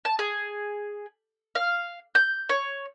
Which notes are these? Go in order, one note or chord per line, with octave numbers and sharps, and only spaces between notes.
A5
G#4
F5
G6
C#5